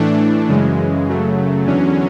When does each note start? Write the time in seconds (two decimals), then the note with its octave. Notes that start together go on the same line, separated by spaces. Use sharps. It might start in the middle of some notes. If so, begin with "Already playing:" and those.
Already playing: A2 E3 A3 D4
0.49 F#2 C#3 E3 G#3
1.07 F#2 C#3 F#3 A3
1.66 E2 D3 F#3 C#4